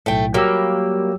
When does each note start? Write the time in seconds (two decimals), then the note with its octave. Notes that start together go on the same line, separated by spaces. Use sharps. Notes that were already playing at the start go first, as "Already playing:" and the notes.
0.06 B1 A2 A3 G5
0.34 F#3 G3 A#3 G4 E6